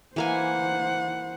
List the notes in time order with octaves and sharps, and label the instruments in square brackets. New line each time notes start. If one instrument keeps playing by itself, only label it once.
[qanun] E3 A#3 G#5 [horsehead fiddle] C5 F#5